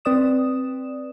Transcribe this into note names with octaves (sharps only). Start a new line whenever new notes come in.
C4 B4 D5 D#6 E7